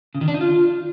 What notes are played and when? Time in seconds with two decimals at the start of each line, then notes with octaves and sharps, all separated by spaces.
0.15 C#3
0.21 D#3
0.28 D4
0.34 D#4
0.41 F4